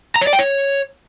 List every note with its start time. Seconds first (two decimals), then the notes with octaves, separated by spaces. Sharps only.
0.16 A#5
0.21 C#5
0.27 D5
0.33 G5
0.39 C#5